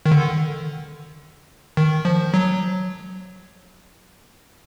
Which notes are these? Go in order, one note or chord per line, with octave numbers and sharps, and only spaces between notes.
D#3
D3
D#3
F3
F#3